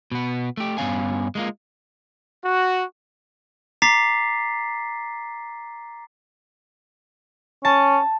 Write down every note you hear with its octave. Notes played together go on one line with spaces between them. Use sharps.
B2 B3
A3 G4
G2 E3 B3 C#4 F5 G#5
G#3 A#3 F4
F#4
A#5 D6 A6 B6 C7
C#4 A5